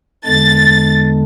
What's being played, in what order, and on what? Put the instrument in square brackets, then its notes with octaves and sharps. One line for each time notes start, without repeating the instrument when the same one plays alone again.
[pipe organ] E2 D3 G#3 D4 [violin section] A6